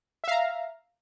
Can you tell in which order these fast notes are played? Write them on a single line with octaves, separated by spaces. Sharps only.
E5 F5 A#5